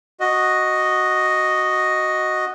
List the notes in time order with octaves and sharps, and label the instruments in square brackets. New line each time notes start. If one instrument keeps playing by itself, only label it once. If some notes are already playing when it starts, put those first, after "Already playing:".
[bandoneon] F#4 D#5